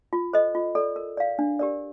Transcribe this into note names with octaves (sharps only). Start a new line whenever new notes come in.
F4
A4 C5 D#5
F4
A4 D5
A#4
D5 F5
D4
G4 A#4 D5